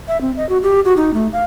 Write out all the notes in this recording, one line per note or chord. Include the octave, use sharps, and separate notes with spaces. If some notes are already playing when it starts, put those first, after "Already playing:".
E5
C4
D#5
F#4
G4
F#4
D#4
A3
F5